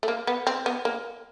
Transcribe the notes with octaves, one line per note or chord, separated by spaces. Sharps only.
A3
A#3
B3
C4
B3
A#3